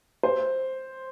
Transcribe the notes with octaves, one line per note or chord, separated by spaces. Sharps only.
C5